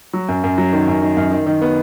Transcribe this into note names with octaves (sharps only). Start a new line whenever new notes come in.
F#3
F#2
F#2
F#3
D#3
F#2
D#3
F#2
D#3
D#3
B3